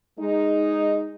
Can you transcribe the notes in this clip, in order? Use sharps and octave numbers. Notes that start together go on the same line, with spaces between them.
G#3 D#4